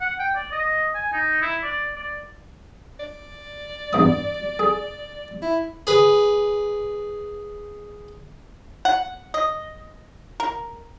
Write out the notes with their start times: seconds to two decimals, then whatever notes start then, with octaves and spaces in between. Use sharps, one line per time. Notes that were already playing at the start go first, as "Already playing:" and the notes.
0.01 F#5
0.19 G5
0.35 D5
0.52 D#5
0.95 G#5
1.13 D#4
1.42 E4
1.63 D5
1.95 D5
3.00 D5
3.93 E2 G2 D#6
4.59 G#4
5.42 E4
5.87 G#4 B4
8.85 F#5
9.34 D#5
10.40 A#4